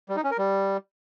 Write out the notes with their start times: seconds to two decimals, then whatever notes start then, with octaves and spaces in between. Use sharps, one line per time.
0.09 G3
0.16 D#4
0.24 C#4
0.31 A#4
0.38 G3